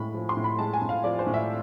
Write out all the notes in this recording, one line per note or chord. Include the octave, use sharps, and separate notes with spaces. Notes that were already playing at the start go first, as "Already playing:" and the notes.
Already playing: A2 G#3 B5
F3
C6
A2
B5
G#3 A5
G#5
A2
F5
F3 D5
C5
A2
E5